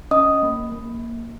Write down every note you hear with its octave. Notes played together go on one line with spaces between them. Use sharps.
C#4 D#5 D#6
A#3
A#3